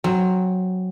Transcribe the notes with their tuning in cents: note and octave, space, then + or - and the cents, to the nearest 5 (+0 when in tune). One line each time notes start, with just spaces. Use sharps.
F#3 +0 C4 +15